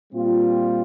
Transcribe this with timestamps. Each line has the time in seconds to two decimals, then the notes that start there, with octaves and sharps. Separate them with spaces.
0.12 A#2 G3 C4 F4